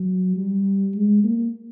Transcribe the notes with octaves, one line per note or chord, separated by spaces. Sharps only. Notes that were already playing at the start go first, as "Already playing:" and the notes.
Already playing: F#3
G3
G#3
A#3